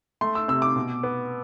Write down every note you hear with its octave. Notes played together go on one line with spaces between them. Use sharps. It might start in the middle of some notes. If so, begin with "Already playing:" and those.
A3 C6
E6
C3 E6
D6
B2
B3